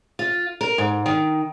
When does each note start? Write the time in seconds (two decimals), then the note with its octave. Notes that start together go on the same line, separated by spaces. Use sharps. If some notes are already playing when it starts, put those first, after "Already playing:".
0.19 F4
0.61 A#4
0.78 G#2
1.06 D#3